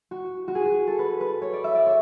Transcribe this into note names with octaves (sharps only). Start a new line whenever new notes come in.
F#4
F#4
G#4
F#4
A4
B4
B4
C#5
D5
E5
D5
C#5